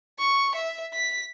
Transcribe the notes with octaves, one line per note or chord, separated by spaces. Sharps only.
C#6
E5
B6